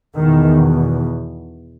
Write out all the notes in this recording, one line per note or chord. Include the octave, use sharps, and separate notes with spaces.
E2 B2 D#3